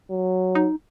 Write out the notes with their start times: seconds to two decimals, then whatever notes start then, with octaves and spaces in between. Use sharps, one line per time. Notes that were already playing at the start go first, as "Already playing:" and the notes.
0.11 F#3
0.55 D#4